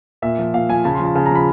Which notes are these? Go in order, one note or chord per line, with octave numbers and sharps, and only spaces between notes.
A#2 E5
F3
A#2 F5
F3 G#5
C#3 A5
C6
F3
A5
C#3 A5
A#5
F3 B5